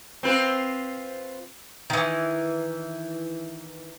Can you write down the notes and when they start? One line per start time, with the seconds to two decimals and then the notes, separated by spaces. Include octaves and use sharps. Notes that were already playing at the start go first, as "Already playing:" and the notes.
0.23 C4 F4 B4
1.90 D#3 E3